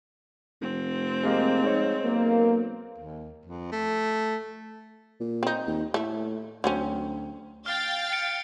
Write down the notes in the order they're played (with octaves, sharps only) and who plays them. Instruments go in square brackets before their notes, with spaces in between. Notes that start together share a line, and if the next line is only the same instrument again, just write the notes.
[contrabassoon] F1 [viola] C4
[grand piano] G#3 A#3 G4
[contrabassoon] G#2 [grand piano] G#3 C#5
[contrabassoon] B1 [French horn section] A#3
[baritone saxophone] D#2
F2
A3
[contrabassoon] A#2
[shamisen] C4 D#4
[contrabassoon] D#2
[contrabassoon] A2 [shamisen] A3 E5
[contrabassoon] D2 [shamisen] F#3 C4 C#4
[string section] F5 G5 A6 [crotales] F6
[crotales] C#7 D7